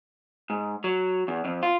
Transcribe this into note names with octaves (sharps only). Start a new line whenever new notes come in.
G#2
F#3
E2
F2
F4